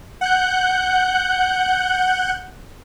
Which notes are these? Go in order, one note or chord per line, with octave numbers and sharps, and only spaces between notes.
F#5 F#6 G6